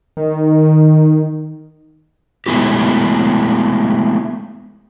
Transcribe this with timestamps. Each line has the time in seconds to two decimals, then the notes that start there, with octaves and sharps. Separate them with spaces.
0.17 D#3
2.46 G#3 A3 B3 E4 G4